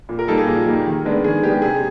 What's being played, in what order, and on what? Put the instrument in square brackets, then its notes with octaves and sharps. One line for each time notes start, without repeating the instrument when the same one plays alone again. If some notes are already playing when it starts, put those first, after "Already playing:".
[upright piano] A#2
A#4
G3 A#3 D#4 A4
G#4
A#2
G3 A#3 D#4
D#3
G#3 B3 D4
D#3 G#4
G#3 B3 D4 G4
C3 G#4